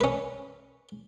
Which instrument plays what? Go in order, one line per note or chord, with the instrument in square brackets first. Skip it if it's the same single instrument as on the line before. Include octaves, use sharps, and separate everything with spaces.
[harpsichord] C#4 B4